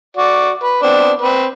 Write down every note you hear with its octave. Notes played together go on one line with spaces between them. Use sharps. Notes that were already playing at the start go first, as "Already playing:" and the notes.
F#4 D5
B4
B3 C4 D4
C4 B4